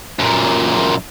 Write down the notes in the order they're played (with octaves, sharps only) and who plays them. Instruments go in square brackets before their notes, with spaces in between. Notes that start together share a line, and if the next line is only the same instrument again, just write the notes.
[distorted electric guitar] F#2 A#2